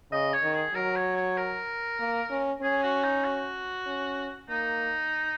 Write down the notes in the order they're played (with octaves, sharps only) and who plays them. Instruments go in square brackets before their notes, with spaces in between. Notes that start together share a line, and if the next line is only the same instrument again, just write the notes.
[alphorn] C#3 [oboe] D#5
[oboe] C#5
[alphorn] D#3
[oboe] G#4
[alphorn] F#3 [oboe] A#4
[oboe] C#5
C#5
A#4
[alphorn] A#3
C#4
[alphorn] C#4 [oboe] G#4
[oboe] F#4
D#4
F#4
[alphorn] C#4
[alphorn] A#3 [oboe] D#4